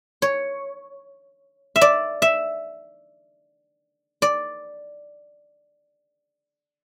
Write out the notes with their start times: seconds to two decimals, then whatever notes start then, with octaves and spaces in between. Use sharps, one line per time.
0.22 C#5
1.76 E5
1.81 D5
2.22 E5
4.22 D5